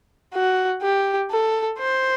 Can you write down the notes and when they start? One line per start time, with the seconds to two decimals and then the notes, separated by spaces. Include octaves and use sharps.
0.34 F#4
0.82 G4
1.31 A4
1.79 C5